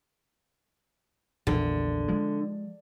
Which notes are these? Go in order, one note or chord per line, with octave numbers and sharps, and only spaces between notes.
A#1 E2 D3
F3 G#3